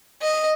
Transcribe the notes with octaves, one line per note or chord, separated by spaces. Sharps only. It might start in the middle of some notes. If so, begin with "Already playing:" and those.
D#5